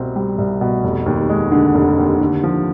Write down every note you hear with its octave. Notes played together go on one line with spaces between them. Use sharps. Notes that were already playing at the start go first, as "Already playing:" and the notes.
Already playing: C2 B2 C4
G3
C2
B2
F1
D#2
G#3
D3
F1
D#2
D3
F3